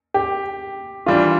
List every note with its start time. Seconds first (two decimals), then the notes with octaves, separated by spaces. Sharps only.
0.14 G4
1.06 E3 G3 D4 F4